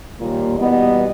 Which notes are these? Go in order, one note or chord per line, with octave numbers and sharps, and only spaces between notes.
D#2 A#2 G3 A#3
B2 E3 G3 B3 D#5